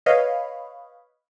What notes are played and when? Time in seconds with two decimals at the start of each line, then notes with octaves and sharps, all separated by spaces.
0.06 B4 C#5 D#5 F5